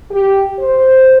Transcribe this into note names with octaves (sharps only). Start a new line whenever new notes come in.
G4
C5